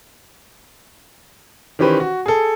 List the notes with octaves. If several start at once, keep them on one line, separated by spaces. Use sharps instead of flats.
D#3 E3 C#4 G4 B4 C5
F#4
G#4 A4